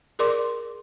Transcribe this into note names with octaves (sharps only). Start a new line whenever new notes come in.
G#4 A#4 D5 C6 D6